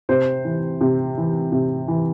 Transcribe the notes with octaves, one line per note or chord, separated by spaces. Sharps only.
C3 C5
E3
C3
E3
C3
E3